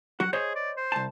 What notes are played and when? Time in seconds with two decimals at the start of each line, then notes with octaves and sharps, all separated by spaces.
0.20 F#3 F#4 F#5
0.33 G#4 C5 C#5 D#5
0.55 D5
0.77 C5
0.92 C2 A5